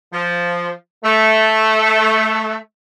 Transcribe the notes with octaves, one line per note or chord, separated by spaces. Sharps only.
F3
A3